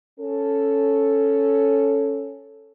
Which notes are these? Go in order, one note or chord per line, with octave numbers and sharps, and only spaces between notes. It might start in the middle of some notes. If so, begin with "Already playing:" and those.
C#4 A4